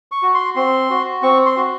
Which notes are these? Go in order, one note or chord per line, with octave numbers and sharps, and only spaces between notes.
C#6
F#4
C6
C4 C6
F#4
C4 C#6
C6
F#4